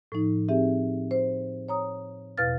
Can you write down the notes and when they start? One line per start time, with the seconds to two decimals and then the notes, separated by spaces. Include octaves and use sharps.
0.12 A2 F3 D#4
0.48 C4 D#4 G4 G#4 E5
1.11 C5
1.68 C#5 A#5 D#6
2.38 E2 B2 B4 F5 F6 A6